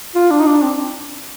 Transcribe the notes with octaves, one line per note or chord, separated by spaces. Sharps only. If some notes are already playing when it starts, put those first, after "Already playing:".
F4
D4
D#4
D4
C4